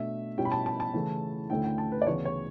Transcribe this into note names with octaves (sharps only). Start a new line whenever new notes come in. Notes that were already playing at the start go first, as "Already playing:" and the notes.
Already playing: B2 A3 D4 E5
B2 G3 C#4 E4 G5
B5
A5
A5
A5
C#3 E3 A3
D2 D3 A3 C#4 E4 G5
G5
A5
B4
D5
D2 C#3 E3 B3 C#5
C#5